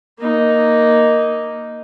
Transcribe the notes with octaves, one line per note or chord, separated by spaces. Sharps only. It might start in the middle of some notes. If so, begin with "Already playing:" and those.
A#3 D#4